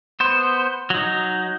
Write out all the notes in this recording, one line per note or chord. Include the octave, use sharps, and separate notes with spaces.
B3 C5
F#3 D#4